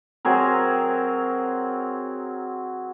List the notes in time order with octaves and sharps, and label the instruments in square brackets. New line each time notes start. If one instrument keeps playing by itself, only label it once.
[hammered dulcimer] F#3 C4 G#4 A#4